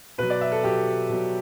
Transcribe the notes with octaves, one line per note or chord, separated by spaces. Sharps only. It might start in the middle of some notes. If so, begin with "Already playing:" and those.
B2 F#3 B4
D5
E5
A4
B2 F#3 G4
B2 F#3